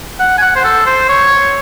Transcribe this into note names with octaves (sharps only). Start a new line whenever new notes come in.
F#5
G#5
F#5
C5
A4
C5
C#5